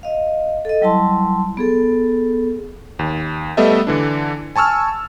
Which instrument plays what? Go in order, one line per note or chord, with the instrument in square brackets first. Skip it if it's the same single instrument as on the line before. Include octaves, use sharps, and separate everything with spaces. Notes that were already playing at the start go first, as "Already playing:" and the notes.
[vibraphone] D#5 F5
A4 D#5
F#3 G3 E4 A5 C6
B3 G#4 A4
[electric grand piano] D#2
G3 A3 B3 A4 D#5 E5
D3 E3 D4
G#5 A5 C#6 E6 F6